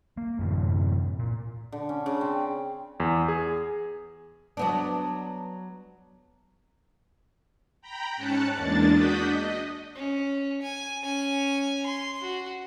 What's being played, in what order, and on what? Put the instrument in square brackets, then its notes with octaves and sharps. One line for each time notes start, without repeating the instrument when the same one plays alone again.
[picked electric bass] A#3
F#2 A2 C3 E3
A#2
[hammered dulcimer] D3
C#4
C#3
C4
[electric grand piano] E2
G#4
[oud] F#3 B3 D4
[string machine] G5 A#5 B5
G#2 C#4 A5 F#6 C#7
E2 G#3 A#3 D4 A6
D4 F#4 F#5 D#6 G6 B6
D#5
[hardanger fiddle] C#4
G#5
C#4 G#5
C6
F#4